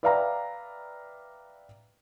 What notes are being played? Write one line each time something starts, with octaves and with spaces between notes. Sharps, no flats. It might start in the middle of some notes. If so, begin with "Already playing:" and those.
B4 D5 E5 F5 G5 A#5